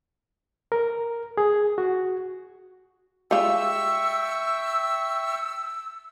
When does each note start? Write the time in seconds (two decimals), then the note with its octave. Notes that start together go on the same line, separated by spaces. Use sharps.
0.72 A#4
1.38 G#4
1.78 F#4
3.31 G3 G#3 F4 E5 G5 C#6 E6